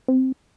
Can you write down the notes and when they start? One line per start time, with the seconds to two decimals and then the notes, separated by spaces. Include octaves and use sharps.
0.08 C4